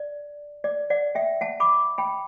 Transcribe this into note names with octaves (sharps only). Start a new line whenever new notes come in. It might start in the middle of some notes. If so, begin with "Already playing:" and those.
Already playing: D5
D5
D5 F#5
E5 G5
F#5 A5
B5 D6
G5 B5